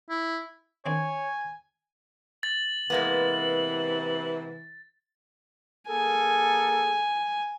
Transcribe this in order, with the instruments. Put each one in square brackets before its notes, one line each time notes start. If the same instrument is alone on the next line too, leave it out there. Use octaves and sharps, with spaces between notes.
[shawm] E4
[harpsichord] D#3 C4 D4 [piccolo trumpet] C#5 [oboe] G#5
[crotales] A6 [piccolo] F#7
[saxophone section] C3 E3 [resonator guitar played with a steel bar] G#3 A#3 B3
[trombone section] A#3 G#4 A4 [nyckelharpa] G#5